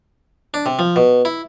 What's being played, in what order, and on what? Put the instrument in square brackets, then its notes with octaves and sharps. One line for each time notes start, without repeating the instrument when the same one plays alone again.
[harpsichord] D4
C3
F3
B2
E4